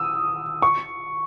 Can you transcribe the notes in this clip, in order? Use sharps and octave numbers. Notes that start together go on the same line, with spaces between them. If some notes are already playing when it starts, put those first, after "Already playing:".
Already playing: D#6 E6
C#6